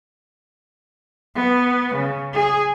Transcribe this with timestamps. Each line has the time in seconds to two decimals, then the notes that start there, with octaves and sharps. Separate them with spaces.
1.36 B3
1.96 C#3
2.34 G#4